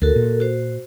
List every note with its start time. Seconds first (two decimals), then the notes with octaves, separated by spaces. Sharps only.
0.02 D2 F#4 A4 A#4
0.16 A#2
0.40 F#4 C5